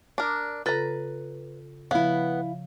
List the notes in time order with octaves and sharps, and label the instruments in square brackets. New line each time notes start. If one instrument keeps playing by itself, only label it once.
[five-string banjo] D4 A#4
[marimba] C#3 F4 A4 [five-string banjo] B4 A#5
[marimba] C#3 F3 [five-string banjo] B3 [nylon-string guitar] E4 F5